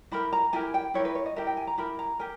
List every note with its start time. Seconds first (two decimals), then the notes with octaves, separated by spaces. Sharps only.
0.12 E4 G4 A#4 B5
0.33 A#5
0.53 E4 G4 A#4 G#5
0.74 G5
0.94 E4 G4 A#4 C#5
1.05 B4
1.15 C#5
1.26 D#5
1.36 E4 G4 A#4 E5
1.47 G5
1.57 G#5
1.67 A#5
1.78 E4 G4 A#4 B5
1.99 A#5
2.19 G4 A#4 G#5